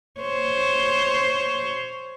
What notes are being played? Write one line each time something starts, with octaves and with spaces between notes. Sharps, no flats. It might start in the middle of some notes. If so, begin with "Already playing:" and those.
C5 C#5